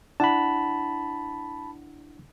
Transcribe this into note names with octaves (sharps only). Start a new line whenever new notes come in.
D4 E4 F#5 A5 B5